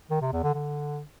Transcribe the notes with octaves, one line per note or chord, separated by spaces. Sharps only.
D#3
C3
E2
D3
D3